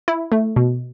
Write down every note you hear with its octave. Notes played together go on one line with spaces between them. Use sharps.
E4
A3
B2